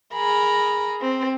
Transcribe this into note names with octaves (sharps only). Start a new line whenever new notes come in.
G#4 A#4 A#5 B5
C4